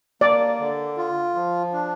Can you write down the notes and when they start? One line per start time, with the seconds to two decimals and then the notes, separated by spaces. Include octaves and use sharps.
0.21 A#3 D5
0.60 D3
0.97 F4
1.35 F3
1.73 D4